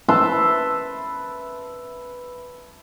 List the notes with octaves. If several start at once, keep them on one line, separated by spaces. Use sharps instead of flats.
B4 E5 A5 C6